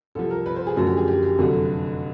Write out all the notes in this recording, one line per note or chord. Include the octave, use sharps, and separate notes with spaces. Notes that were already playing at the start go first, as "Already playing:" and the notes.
C2 C3 F3 A4
A#4
B4
C5
G#4
F#2 D3 F3 A3 F#4
G4
G#4
G4
G4
F1 F2 D3 F#3 F#4